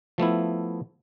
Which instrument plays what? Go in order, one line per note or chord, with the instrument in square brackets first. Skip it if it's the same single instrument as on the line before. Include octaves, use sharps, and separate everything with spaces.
[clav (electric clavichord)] F3 A3 B3 E4